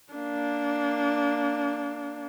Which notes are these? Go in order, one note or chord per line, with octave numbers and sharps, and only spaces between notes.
A#3 D4